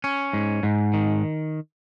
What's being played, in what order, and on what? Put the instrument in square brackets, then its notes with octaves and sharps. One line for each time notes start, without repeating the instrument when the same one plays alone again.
[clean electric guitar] C#4
G#2
G#2
D#3